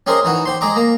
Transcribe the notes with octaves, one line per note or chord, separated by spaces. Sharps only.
C#4 G4 G#4 A#4 C5 D#5
E3 D#4 F#4
G4 C5 C6
G#3 G#4 D#5 A#5 D6
A#3 A#5